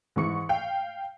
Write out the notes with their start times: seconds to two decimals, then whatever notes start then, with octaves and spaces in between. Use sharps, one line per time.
0.16 G#2 E3 C#6 C#7
0.49 F5 G5